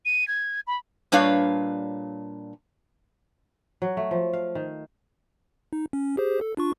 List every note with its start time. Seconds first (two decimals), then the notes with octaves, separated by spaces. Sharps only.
0.05 D#7
0.28 G#6
0.67 B5
1.12 A#2 G3 D4 B4 C#5 F5
3.82 F#3
3.97 A3
4.11 F3
4.33 F5
4.55 D#3
5.73 D#4
5.93 C#4
6.17 G4 G#4 C5
6.41 A4
6.57 D4 F4 C#6